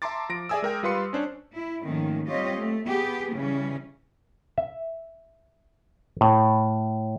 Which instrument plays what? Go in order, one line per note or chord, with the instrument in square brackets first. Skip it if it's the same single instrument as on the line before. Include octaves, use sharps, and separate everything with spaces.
[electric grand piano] E5 A5 A#5 C6 D6 A6
F3 A#6 D7
G#4 D5 E5 G#5 D#6 E6
G#3 A#4 G5
G3 F4 B4 F5 C6 C#7
C#4 D4 C5 C#5
[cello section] E4
G#2 D#3 F3 A3 A#3 C#4
G3 C4 F4 G4 C#5 D#5
A3
B3 G4 G#4
C#3 E3 G3 C#4
[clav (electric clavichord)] E5
A2